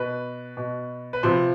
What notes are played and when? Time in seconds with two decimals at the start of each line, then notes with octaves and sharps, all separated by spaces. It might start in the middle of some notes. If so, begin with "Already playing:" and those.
Already playing: B2 B4
0.57 B2
1.13 B4
1.23 C3 F3 C5